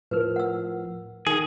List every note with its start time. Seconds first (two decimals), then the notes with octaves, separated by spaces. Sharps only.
0.11 A2 F3 A#4 B4 F6
0.36 F#5 E6
1.27 D#3 G#4